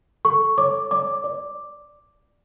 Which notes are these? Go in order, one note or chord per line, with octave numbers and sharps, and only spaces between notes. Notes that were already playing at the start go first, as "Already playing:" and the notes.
A4 C#6
C#5 D6
D5 D6
D5